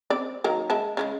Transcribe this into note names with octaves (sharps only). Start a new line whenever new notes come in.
C4 D5
D#3 F#3 A#3
G#3 E5 A5
C#3 F3 G#3